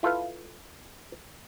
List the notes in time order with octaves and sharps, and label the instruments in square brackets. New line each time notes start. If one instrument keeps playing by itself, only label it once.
[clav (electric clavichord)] E4 F4 A4 B4 F5